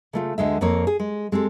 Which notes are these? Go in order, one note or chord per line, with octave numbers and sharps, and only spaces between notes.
C#3 A3 F4
D2 D3 G#3 E5
F2 A#3 C4 C#5
G#4
G#3
G#3 C4 G4 A4